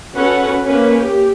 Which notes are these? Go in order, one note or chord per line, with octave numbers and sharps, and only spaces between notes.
C#4 F#4 A4 B4 F#5
A#3 C#4 B4
G4